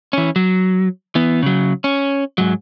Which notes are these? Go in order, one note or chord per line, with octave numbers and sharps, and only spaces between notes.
E3 C#4
F#3
E3 B3
C#3 F#3
C#4
G#2 F#3